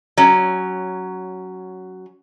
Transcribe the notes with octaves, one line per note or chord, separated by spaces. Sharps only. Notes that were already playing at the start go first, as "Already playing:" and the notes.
F#3 C#4